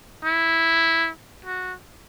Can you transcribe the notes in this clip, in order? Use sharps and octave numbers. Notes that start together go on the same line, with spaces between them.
E4
F#4